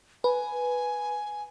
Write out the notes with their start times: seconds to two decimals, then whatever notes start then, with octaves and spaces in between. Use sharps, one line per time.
0.24 B4 G#5